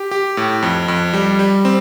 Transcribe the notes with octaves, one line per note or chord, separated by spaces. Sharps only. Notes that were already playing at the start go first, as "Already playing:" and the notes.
Already playing: G4
G4
A2
F2
F2
G3
G3
C4